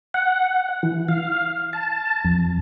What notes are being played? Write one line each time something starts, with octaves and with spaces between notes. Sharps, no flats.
F#5
E3
F5
A5
F2